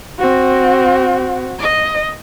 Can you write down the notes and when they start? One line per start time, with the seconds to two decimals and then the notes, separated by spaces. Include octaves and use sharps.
0.20 C4 F#4
1.59 D#5